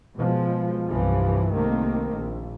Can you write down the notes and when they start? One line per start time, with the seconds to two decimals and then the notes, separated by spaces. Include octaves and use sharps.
0.16 B2 F3 G#3
0.89 C2 G2 E3 F3
1.52 C2 D#3 A3 A#3 C4
2.17 A#1